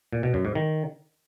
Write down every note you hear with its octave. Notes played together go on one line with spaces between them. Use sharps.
A#2
B2
F#2
G#2
D#3